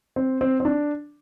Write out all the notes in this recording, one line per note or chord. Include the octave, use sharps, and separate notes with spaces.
C4
C4
C4
D4